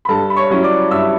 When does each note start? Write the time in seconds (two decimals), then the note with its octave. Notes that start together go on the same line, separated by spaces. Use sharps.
0.05 B5
0.08 G2 A4 A5
0.30 B5
0.36 C#5 C#6
0.50 F#3 C#4 E4
0.63 D5 D6
0.91 G2 E5 E6